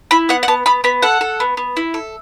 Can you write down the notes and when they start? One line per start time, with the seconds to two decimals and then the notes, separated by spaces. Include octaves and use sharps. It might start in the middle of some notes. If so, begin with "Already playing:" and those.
0.11 E4 B5
0.29 B3 F#5
0.43 F#5
0.48 B3 A5
0.66 B3 B5
0.84 B3 B5
1.02 A4 F#5
1.21 A4
1.40 B3
1.57 B3
1.77 E4
1.94 A4